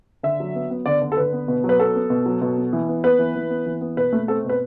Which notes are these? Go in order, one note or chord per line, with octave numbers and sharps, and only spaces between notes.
D3 E5
F#3
B3
B3
D3 D5
D3
A4
D3 B4
B3
B2
F#3
B4
B3 A4
B3
B2
F#3
B2
B3
E3
B3
B3 B4
E3
E3
B3
E3
B3
B2 B4
A3
C4 A4
B2
B4